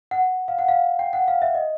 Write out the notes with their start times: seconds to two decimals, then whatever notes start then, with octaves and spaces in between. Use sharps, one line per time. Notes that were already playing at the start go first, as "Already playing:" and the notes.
0.11 F#5
0.48 F5
0.59 F#5
0.68 F5
0.99 G5
1.13 F#5
1.28 F5
1.42 E5
1.55 D#5